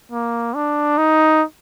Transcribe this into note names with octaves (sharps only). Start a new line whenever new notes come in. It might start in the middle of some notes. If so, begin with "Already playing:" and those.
A#3
D4
D#4